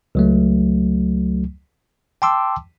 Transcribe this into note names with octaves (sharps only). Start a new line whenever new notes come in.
C#2 F#3 A3
G5 A5 C6 D6 E6